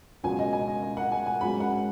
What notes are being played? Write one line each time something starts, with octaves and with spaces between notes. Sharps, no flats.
C#2 B2 F#3 B3 G#5
D#5
G#5
D#5
D#5
F#5
G#5
G#5
G#2 F#3 C#4 B5
F#5